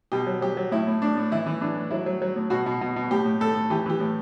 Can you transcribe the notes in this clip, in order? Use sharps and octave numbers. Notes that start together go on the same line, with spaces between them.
B2 G4
F#3
F#3 G4
F#3
A2 E4
A2
A2 D4
A2
E3 E4
E3
E3 D4
A2
F#3 E4
F#3
F#3
A2
B2 F#4
B2
B2
B2
A2 G4
A2
A2 A4
A2
E3 G4
E3 G4
A2